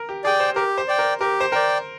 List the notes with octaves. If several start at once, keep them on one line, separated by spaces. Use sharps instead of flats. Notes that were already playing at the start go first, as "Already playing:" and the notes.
Already playing: A#4
G4
G#4 D5 G5
C5
G4 A#4
C5
D5 G5
A#4
G4 A#4
C5
A#4 D5 G5